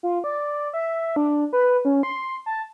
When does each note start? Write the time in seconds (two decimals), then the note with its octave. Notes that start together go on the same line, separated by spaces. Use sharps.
0.03 F4
0.24 D5
0.74 E5
1.16 D4
1.53 B4
1.85 C#4
2.03 C6
2.46 A5